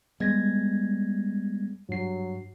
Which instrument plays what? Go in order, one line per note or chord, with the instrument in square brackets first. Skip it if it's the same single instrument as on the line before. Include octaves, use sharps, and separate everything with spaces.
[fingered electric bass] G3 B3 [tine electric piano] G#3 G#6 A#6
[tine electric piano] G2 C7 [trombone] F#3